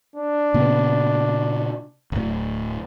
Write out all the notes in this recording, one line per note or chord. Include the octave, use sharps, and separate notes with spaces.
D4
A#2 C#3 B3
D1 A2